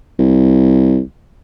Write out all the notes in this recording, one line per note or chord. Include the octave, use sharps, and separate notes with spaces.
C2